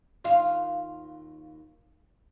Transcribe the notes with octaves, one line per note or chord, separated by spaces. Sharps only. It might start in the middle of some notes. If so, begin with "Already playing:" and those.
D#2 F4 F5